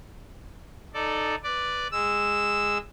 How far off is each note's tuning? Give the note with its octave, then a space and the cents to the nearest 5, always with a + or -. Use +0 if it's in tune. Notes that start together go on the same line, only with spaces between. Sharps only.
D#4 -15 A4 +0 D5 +0
B4 +0 D5 +0
G#3 -15 E6 +0